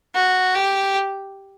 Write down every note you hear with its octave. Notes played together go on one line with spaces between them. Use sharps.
F#4
G4